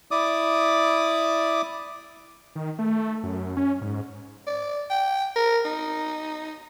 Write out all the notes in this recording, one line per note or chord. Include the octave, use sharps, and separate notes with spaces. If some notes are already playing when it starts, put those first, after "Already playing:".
E4 D5 D6 D#6
D#3
A3
F#2
C#4
G#2
D5
G5
A#4
D#4